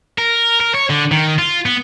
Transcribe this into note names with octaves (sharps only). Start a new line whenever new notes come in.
A#4
A#4
C#5
D3
D#3
F4
B3